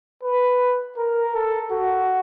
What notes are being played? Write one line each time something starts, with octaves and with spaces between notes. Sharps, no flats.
B4
A#4
A4
F#4